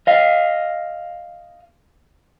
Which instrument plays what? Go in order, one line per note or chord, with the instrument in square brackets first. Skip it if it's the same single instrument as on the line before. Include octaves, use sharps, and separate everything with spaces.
[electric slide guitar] D#5 F5